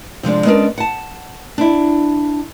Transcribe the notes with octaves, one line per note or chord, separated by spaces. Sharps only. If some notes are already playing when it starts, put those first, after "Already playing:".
C3 F3 G#3 D4
G#3 B3 C#4 D4 G#4 A#4
F#5 A5
D4 E4